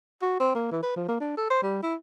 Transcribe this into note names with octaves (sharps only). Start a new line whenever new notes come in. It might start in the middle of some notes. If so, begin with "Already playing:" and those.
F#4
C4
A#3
E3
B4
F3
A#3
D4
A4
C5
G3
E4